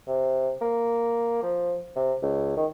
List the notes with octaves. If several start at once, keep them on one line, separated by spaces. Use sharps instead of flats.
C3
A#3
F3
C3
C#2
D#3